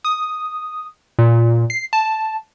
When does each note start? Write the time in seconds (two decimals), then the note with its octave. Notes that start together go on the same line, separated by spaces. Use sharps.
0.04 D#6
1.19 A#2
1.70 C7
1.93 A5